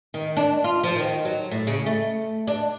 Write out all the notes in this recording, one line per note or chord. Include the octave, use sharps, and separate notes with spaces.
D#3
D4
F4
F3
D#3
F#3
A2
C#3
A3
D4